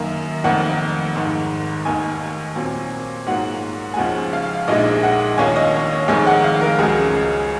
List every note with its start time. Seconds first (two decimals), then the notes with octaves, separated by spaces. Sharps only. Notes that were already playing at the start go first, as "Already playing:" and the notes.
Already playing: F#2 D#3 A#3
0.44 F1 F2 D#3 A#3 F#5
1.15 G#1 G#2 D#3
1.85 F1 D#2 D#3 G#5
2.56 A#2 F#3 C4
3.26 G#2 F#3 A#3 F4 F#5
3.94 G#5
3.97 D#2 C#3 F3 G#3 F#5
4.33 F5
4.68 A#1 A#2 F3 G#3 D#4 D#5
5.03 F#5
5.38 D#2 D#3 A#3 C#4 F4 G#5
5.56 D#5
5.74 C#5
5.92 C#5
6.08 F1 F2 D#3 G#3 D#4 G#5
6.27 F#5
6.44 F5
6.61 A#4
6.79 C#2 C#3 F#3 G#4